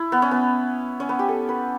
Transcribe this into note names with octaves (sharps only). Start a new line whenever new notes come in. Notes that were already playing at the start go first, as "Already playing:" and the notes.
Already playing: E4
B3
C#4
B3
C#4
B3
G4
A4
B4